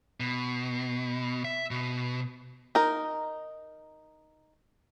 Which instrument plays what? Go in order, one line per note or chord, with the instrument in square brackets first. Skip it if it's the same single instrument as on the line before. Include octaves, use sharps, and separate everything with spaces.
[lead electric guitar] B2
E5
B2
[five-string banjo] D#4 A#4